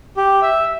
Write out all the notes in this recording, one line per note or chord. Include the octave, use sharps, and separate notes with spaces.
G4
E5